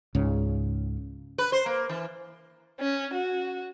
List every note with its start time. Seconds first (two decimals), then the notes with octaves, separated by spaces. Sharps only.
0.15 C#2 G#2 C#3
1.38 B4
1.52 C5
1.66 A#3
1.89 E3
2.80 C#4
3.14 F#4